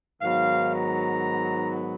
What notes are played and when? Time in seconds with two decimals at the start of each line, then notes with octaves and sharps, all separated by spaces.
0.21 G#2 D#3 F#3 B3 F5
0.72 A#5